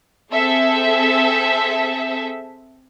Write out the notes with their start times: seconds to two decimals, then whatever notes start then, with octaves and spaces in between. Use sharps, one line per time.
0.32 C4 G#4 A4 E5